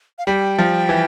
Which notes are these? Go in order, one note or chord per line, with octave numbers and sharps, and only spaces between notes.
F5
G3 G5
F3
E3